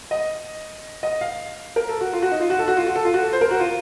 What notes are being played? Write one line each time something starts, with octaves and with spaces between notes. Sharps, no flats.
D#5
D#5
F5
A#4
A4
F#4
F4
F#4
D#4
F4
F#4
A4
F#4
F4
F#4
A4
F4
F#4
A4
C5
A#4
F#4
F4